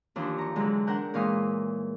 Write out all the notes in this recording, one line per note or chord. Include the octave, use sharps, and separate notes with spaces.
D#2 E3 F3 D4
A#5 C#6
D3 E3 F#3 G#3
D4 A#4 C#5 F#5 G5 A#5
A#2 E3 G#3 F5 C#6 D#6